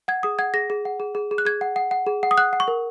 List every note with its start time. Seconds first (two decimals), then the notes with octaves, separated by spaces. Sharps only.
0.08 F#5 G#6
0.23 G#4 D#6
0.39 F#5 G#6
0.54 G#4 A#6
0.70 G#4
0.85 F#5
1.00 G#4
1.15 G#4
1.31 G#4
1.38 F#6
1.45 G#4 G#6
1.61 F#5
1.76 F#5
1.91 F#5
2.07 G#4
2.23 F#5
2.31 D#6
2.38 F#5 F#6
2.53 F#5
2.60 C#6
2.68 A#4